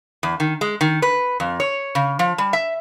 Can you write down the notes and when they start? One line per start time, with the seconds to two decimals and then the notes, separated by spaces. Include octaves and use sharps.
0.23 E2
0.40 D#3
0.61 G#3
0.81 D#3
1.02 B4
1.40 F2
1.60 C#5
1.95 C#3
2.19 F3
2.38 G3
2.53 E5